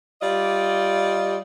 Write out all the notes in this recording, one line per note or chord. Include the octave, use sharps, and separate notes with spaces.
G3 F4 D5 D#5